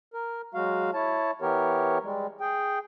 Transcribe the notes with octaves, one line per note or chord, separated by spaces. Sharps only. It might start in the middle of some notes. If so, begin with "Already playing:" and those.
A#4
F#3 G#3 F#4 F5
E4 C#5 A5
E3 B3 G4 A#4 C#5
G3 G#3
G#4 G5